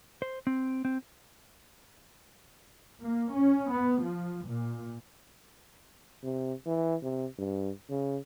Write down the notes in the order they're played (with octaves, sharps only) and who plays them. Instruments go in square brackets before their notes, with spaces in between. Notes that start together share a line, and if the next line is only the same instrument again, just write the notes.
[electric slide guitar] C5
C4
C4
[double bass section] A#3
C#4
B3
F3
A#2
[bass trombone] C3
E3
C3
G2
C#3